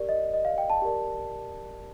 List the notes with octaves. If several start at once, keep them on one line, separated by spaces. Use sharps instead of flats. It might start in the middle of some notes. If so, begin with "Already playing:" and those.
Already playing: G4 A#4 D5
D#5
D#5
F5
G5
A5
G4 A#4 D5